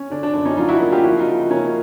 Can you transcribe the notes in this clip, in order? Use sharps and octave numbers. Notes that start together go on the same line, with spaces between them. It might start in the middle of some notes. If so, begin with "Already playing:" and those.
Already playing: C#4
D3 D4
D4
F#2 D4
C#4 D#4
F#3 D#4 F4
E4 F#4
A#3
F4 G4
F3 E4 F#4
D#4 F4
C#3
A#3 C#4 D#4